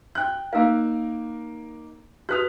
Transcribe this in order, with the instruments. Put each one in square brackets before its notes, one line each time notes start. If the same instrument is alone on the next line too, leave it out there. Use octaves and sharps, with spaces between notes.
[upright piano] G5 F#6
[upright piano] A#3 D#4 A#4 [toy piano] F5 E6
[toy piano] F#4 B4 D#6 [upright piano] F#6 B6 F7